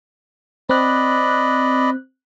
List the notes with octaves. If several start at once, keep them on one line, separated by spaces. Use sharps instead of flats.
C4 D5 D#5 B5 F#6